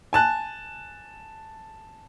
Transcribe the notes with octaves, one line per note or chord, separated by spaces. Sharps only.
G#5 A5 F#6